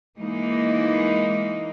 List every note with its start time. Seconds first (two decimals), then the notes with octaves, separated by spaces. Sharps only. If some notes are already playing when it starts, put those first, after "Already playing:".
0.18 E3 G#3 A#3 D#4